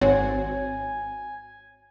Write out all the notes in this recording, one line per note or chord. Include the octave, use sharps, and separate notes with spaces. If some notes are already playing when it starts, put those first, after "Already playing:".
G#1 C4 F#4 C#5 G#5